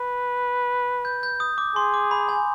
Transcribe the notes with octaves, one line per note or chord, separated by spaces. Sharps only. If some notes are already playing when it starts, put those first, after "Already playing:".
Already playing: B4
G6
G6
D#6
D6
G#4 C6
D6
B5
G#5